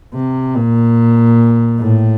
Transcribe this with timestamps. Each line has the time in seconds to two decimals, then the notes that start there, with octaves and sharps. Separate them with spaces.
0.14 C3
0.55 A#2
1.79 A2